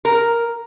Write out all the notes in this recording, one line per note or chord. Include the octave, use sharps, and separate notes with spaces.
A#4